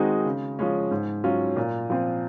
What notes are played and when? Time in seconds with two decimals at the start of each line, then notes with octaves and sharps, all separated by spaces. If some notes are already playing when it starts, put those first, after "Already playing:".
Already playing: D#3 G#3 C4 D#4 F#4
0.25 C#3
0.59 F3 G#3 C#4
0.91 G#2
1.24 F#3 C#4 F4
1.56 A#2
1.90 F3 C4